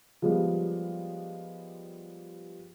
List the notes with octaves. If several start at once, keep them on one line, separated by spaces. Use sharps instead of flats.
F3 G3 G#3 B3 G4